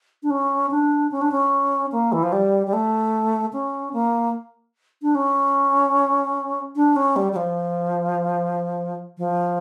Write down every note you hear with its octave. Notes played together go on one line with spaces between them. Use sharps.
D4
C#4
D4
C#4
D4
C#4
A#3
E3
F3
G3
G3
A3
C#4
A#3
D4
C#4
D4
C#4
G3
G3
F3
F3